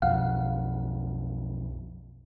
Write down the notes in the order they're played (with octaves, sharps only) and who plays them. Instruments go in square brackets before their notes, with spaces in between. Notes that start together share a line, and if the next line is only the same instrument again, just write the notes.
[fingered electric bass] B1 F2 [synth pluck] F5 F#5